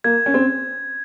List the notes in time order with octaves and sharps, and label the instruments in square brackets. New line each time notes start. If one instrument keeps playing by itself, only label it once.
[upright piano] A#3 [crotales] G#6
[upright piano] C#4
C4